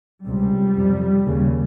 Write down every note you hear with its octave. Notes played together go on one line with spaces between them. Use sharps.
C#2 C3 G3
F2 C3
D#2 C#3